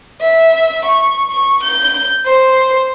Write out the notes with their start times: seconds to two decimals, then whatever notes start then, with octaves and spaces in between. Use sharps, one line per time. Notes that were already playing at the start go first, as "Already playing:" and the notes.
0.21 E5
0.85 C#6
1.30 C#6
1.63 G6
2.25 C5